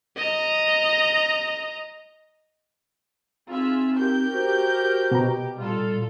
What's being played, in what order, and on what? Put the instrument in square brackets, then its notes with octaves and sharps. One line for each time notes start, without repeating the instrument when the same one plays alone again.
[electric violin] D#5 A#5
[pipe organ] C4 D#4 [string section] F4 G#4 E5
[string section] G4 A#4 G6
[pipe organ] F#4 C5
[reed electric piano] B2 A#5
[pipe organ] A#2 G3 [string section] F4 A4